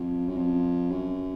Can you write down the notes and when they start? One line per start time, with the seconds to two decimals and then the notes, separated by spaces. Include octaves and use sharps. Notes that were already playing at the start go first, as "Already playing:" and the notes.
Already playing: F2
0.28 F#2
0.37 F2
0.91 F#2